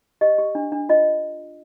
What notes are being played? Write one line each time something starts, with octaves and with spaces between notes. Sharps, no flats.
G4 D#5
G4
D4
D4
F4 D#5